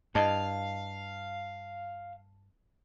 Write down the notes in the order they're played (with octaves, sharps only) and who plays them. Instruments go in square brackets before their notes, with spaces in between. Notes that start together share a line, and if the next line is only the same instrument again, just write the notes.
[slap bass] G2 [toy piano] E4 D#5 D#6 [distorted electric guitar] F5 [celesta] A5